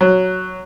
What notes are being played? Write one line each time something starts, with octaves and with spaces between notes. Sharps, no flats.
F#3